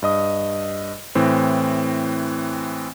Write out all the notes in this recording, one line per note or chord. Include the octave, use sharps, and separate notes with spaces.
G2 D#5 D#6
A2 E3 C4